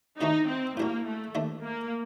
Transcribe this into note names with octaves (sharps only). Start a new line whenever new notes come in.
C3 D#3 A3 D4 D#4 F#4
C4
A2 G3 A#3 D4 F#4
A3
D#2 D#3 A3 D4
A#3